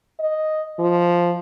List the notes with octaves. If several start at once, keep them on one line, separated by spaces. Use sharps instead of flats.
D#5
F3